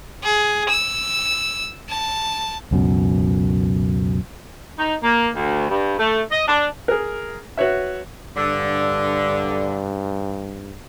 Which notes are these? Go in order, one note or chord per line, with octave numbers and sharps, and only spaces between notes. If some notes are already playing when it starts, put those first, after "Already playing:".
G#4
E6
A5
C#2 F#2 B2
D#4
A#3
D2
G2
A3
D#5
D4
G#4 A#4
F#4 B4 C#5 E5
G2 D3